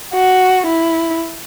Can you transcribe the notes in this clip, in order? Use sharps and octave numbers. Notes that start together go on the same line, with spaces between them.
F#4
E4